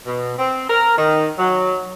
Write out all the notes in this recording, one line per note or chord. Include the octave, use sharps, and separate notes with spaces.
B2
C4
A#4
D#3
F#3